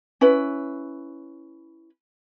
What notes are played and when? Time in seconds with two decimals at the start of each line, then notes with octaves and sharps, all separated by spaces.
0.21 C#4 E4 B4